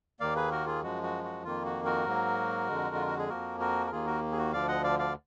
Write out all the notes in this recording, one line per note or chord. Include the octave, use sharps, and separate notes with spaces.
D#2 D#3 A#3 D5 F5
G#4 B4
F#4 A#4
F4 G#4
F#2 F3 G#3 F#4
F#4
F#4
F2 D#3 A#3 F4
F#4
F#4 A#4
G#2 F#3 A#3
F2 D3 G#3
F4
F#4
G#4
F2 F3 A#3 F#4 A#4
F#4 A#4
A#4
D#2 D#3 A#3 F4 G#4
F#4 A#4
G#4
F#4
D2 D3 F3 D5 F5
D#5 F#5
D5 F5
D5 F5